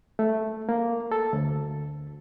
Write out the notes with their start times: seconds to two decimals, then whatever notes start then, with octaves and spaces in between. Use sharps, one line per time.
0.19 A3
0.69 A#3
1.12 A4
1.33 D2